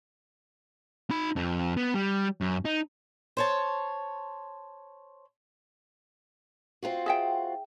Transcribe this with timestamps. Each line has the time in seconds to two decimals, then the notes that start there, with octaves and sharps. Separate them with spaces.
1.10 D#4 B5
1.36 F2 F3
1.77 B3
1.94 G3
2.41 F#2
2.65 D#4
3.37 C5 C#5 A5
6.83 C4 F4 F#4
7.06 G#4 E5 G5